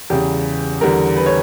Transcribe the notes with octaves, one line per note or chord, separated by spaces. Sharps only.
E2 C#3 G3 G4
E2 D3 G3 A#4
B4
C#5